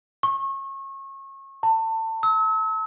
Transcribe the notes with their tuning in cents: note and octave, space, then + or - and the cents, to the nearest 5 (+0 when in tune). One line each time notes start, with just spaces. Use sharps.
C#6 -30
A5 +30
E6 -40